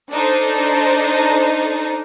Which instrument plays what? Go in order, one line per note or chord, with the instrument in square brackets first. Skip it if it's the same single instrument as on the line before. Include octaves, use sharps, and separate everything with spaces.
[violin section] D4 D#4 A4 C5